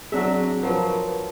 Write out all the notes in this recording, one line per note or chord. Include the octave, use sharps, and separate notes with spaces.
F#3 C4 D4 G#4 E5
F3 F#3 A#4 B4